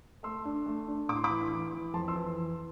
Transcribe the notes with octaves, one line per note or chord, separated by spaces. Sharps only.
A3 C6 E6
D4
A3
D4
A2 D6
C6
B5 D6
E3
E3
E3
F2 A5 C6
C6 E6
E3